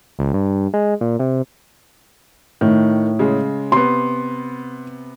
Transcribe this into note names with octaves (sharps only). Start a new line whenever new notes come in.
C#2
G2
G#3
A#2
C3
A2 D#3
C#3 G#3
C3 B3 C6